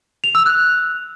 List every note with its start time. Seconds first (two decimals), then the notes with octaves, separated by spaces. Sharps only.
0.24 F7
0.35 E6
0.46 F#6